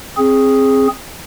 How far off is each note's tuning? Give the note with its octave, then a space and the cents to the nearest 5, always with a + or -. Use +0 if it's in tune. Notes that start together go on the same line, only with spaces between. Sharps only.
C4 +20 G#4 +0